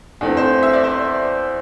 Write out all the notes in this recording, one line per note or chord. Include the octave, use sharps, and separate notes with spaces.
E2 E3 A3 C4
C5
E5
D5
C5